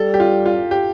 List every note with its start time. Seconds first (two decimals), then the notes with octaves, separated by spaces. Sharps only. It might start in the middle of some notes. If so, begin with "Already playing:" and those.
Already playing: G3 A4
0.14 G4
0.20 F4
0.46 F4
0.71 G4